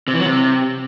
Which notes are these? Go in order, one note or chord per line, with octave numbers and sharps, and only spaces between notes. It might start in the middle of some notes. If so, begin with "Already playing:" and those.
C3
E3
F#3
C3